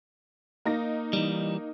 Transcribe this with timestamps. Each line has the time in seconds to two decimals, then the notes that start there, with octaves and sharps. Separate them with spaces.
0.65 A#3 D#4 A#6
1.13 E3 G3